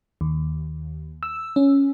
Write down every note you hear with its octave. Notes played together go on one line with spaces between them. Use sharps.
D#2
E6
C#4